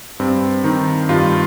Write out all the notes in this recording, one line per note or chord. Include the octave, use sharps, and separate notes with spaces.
G2 C4
D#3 D#4
G2 F4